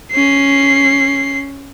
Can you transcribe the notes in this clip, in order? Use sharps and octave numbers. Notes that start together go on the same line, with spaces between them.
C#4 C7